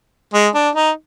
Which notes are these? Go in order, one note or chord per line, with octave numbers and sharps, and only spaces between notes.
G#3
D4
D#4